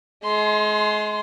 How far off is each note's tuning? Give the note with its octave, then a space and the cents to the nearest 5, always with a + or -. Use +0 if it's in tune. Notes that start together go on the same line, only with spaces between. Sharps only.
G#3 +35 C6 -5